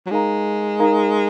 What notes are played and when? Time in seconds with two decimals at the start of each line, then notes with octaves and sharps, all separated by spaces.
0.06 F#3
0.10 G#3 D#4 A#4 F5 A#5
0.79 D#4 A#4 F5 A#5